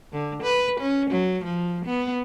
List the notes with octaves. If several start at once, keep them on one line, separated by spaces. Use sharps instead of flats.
D3
B4
C#4
F#3
F3
B3